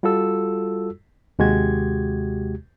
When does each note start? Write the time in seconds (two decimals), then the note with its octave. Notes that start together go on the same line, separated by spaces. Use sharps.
0.03 G3 F4 F#4 A4 E6
1.39 D#2 C3 G#3 F#4 G4 G#6